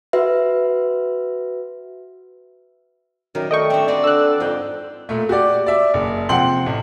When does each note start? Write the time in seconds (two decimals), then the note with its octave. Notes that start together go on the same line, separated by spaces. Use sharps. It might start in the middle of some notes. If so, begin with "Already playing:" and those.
0.13 F#4 B4 E5
3.35 F#2 D#3 G3 A#4
3.51 A3 D#5 G5 C#6
3.70 C4 D4 E5
3.88 C4 F#4 B4 D5
4.04 D3 E6 F#6
4.40 F2 G#2 G5
5.09 A#2 A3
5.29 F#4 G4 D5
5.66 D5 E5
5.94 F#1
6.29 C3 F3 F#5 G5 C6 F#7
6.66 A1